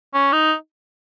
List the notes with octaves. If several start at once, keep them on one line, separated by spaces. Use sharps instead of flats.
C#4
D#4